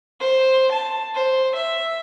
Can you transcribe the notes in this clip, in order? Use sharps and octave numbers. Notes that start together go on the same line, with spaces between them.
C5
A5
C5
E5